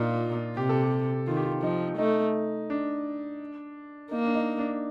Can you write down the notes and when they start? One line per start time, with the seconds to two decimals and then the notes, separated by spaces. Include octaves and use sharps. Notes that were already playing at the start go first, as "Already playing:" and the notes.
Already playing: A#2 D4 D#4 F4
0.56 C3 G4
0.69 A4
0.83 G4
1.27 D#3 F4
1.37 G4
1.45 F4
1.63 F3 D#4
1.98 A3 D#4
2.70 D4
4.11 A#3 D#4
4.26 D4
4.35 D#4
4.59 D4